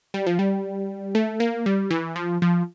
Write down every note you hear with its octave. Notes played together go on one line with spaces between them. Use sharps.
G3
F3
G3
A3
A#3
G3
E3
F3
F3